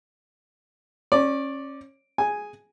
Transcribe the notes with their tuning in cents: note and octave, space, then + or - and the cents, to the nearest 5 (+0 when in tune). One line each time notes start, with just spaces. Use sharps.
C#4 -25 D5 +0
G#4 +0 G#5 +0